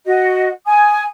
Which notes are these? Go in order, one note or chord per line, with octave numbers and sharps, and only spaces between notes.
F#4 D#5
G#5 D#6